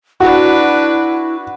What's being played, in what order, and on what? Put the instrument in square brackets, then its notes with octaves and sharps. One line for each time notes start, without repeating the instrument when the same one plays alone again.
[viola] D4 B4 [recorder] E4 [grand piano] F#4